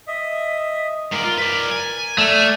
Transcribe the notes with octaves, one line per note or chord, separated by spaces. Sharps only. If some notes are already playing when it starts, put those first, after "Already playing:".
D#5 E5
G#2 A#4 D5
F4
B4 D5
G#5
A3 D5 F6